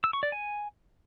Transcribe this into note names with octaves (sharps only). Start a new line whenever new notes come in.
E6
C#6
D5
G#5